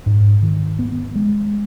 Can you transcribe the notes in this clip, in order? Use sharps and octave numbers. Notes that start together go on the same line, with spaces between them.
G#2
D#3
B3
G#3